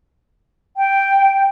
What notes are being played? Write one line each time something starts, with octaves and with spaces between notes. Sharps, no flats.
G5